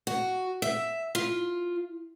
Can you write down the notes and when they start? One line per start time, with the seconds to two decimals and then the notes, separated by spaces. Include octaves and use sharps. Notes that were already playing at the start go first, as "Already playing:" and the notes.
0.07 F#4
0.62 E5
1.15 F4